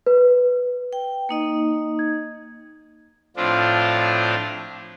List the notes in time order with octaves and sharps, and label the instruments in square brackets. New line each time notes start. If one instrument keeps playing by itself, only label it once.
[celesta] B4
[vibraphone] G5
A#3 D#4 D#5
[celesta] G#6
[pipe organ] A2 F3 C4 D4 F4